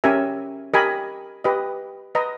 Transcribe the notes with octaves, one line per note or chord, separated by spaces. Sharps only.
C#4 G4 A#4 E5 G#5
G4 A#4 D#5 G#5 B5
G4 B4 D#5
B4 D#5 A#5